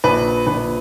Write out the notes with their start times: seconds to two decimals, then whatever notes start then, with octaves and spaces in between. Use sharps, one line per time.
0.04 A#1 B4
0.46 A#1 B4